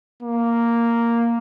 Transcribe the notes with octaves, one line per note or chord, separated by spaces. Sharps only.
A#3